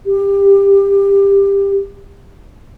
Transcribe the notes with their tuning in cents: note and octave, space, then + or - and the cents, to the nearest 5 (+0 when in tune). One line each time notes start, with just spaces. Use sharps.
G4 +15